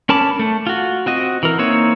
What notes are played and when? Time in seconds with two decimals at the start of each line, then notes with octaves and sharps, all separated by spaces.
0.09 C#4 A#4 A5 B5 D6
0.39 A3
0.67 F4 F#4
1.06 C4 F#4 D#5
1.43 E3 A#4
1.59 A#3 C4 D#4 C#5 E5